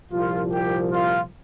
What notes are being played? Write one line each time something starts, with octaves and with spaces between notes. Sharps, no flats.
C2 A#2 F3 F4
G4
F4